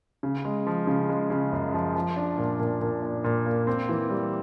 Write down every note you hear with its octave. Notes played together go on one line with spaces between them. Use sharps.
C#3
G#3
F3
C#3
G#3
C#3
F#2
F3
F3
D4
A#2
A#2
A#2
D4
A#2
A#3
C4
E3
G3